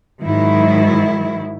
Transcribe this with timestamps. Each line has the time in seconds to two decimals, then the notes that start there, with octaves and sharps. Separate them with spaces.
0.23 G#2 D#3 F#3 E4